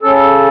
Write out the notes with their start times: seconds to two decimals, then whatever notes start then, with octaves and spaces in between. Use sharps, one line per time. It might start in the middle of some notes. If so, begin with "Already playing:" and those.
0.02 C#3 A4